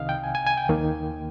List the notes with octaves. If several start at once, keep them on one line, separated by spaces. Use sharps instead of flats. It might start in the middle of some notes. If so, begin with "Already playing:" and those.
Already playing: C2 C3 D#3 D#5 F5
G5
G#5
G#5
G#5
G5
D#2 D#3 A#3